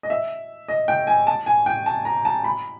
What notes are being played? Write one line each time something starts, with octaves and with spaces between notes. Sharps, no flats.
D#5
E5
D#5
G5
G#5
A5
G#5
G5
A5
A#5
A5
B5